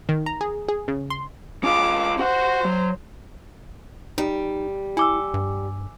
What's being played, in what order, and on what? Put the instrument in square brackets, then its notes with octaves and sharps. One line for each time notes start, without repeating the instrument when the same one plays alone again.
[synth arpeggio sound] D#3
A#5
G#4
G#4
C#3
C6
[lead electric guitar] C#4 F4 [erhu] D6
[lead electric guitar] F#4 F#5 [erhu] C5
[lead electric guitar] F#3
[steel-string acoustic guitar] G3 [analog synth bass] D#4
[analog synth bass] E4 [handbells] G#5 D6 E6
[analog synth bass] G2